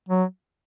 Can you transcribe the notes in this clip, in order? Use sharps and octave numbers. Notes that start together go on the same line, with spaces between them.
F#3